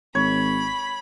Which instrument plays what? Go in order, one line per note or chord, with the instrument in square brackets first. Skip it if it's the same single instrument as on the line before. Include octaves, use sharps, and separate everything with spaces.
[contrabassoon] G#1 [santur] C#5 [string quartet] B5